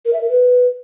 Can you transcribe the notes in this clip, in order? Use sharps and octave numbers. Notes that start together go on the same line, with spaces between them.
A#4
E5
A#4
B4